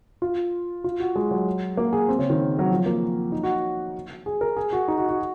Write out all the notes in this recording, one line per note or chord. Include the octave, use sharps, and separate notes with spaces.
F4
F4
F#4
G#3
F#3
A#3
G#4
C4
C#3
D#3
F#3
F3
A#3
D#4
F#4
G#4
A#4
G#4
F#4
D#4
F#4
F#4